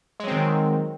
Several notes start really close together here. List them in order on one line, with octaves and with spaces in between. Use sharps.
G#3 F#3 C4 D#3